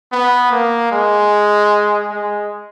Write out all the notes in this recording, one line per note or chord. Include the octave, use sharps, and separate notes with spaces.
B3
A#3
G#3
G#3